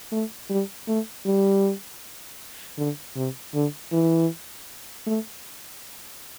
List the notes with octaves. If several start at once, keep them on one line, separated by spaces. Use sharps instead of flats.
A3
G3
A3
G3
D3
C3
D3
E3
A3